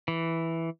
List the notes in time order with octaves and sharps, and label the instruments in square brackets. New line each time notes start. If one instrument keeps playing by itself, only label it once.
[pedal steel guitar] E3